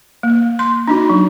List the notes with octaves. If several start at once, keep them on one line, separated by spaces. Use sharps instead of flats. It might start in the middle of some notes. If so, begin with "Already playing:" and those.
A#3
C6
D4 D#4 F#4
F#3